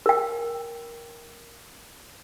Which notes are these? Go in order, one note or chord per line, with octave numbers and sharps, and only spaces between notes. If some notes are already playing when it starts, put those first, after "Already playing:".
A#4 G5